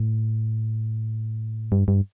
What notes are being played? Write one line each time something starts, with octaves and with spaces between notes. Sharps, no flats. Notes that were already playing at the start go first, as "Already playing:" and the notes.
Already playing: A2
G2
G2